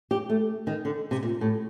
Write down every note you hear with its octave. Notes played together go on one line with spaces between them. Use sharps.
G4
A3
D#3
D3
C3
A#2
A2